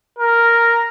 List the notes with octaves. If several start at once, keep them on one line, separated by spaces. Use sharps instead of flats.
A#4